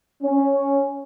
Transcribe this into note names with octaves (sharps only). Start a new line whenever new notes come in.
C#4